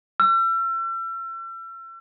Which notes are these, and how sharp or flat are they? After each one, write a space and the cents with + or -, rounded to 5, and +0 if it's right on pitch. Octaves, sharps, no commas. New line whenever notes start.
E6 +40